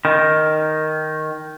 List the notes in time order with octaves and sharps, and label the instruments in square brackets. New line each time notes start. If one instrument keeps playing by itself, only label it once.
[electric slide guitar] D#3